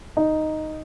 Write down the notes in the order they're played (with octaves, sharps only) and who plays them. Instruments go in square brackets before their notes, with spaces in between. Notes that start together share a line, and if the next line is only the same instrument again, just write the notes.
[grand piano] D#4